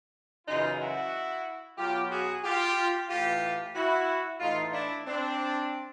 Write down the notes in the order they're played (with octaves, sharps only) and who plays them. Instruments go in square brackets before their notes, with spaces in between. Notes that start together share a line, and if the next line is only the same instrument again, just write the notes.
[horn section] F#2 C#3 E3 D#4 F4
E4 F#4
B2 F#3 F4 G4
F#4 G#4
F4 G4
A2 E3 F4 G4
E4 F#4
A2 E3 D#4 F4
D4 E4
C4 D4